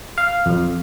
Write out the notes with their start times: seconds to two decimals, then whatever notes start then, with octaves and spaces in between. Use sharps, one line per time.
0.18 F5
0.46 F2